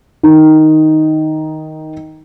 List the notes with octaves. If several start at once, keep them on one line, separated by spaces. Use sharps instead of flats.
D#3 D#4